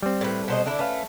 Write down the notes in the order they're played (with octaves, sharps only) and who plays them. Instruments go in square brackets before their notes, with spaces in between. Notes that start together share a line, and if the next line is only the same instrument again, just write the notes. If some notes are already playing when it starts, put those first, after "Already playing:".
[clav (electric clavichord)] G3 C4
[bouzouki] A2 B4
B2 C5 D#5
D3 D4 E4
[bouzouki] A3 [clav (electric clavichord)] C#4 B4 F5